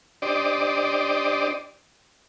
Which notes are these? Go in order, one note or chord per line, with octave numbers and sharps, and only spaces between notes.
D4 G4 C5 D5 D#5